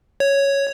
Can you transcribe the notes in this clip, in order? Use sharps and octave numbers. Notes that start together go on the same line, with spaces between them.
C#5